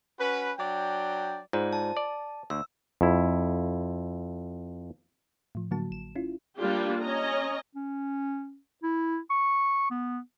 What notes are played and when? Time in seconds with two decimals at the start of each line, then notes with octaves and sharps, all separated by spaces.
0.19 C#4 F#4 B4
0.58 F#3 D4 D5 G5
1.53 G#2 F4 C5 D5
1.73 A5
1.97 D5
2.50 D2 E6
3.01 F2 E4
5.55 A2 F3
5.71 A2 D3 F#3 A#3 F#4 A5
5.91 A1 E7
6.16 C#4 E4 F4
6.59 G3 A#3 D4 F4 G4
7.01 C#4 D#5 G#5 A#5
7.75 C#4
8.83 E4
9.30 C#6
9.91 B3